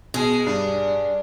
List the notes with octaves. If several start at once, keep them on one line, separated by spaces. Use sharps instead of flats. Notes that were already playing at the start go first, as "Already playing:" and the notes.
B2 G#3 G#4
G2 D4